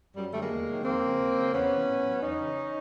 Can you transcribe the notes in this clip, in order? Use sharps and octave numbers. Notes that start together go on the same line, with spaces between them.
F#2 G3
D3 F#3 G3 A3
G#3 A#3
E2
C3 D#3 F#3
F2 A#3 C4
C#3 F3
D#2
C#3 F#3
E2 B3 C#4
C3 E3
A2
F#3
E2 C#4 D#4
C#3 E3